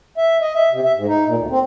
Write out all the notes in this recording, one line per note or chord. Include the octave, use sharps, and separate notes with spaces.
E5
D#5
E5
C3
E5
G#2
D#4
A#2
D2
C4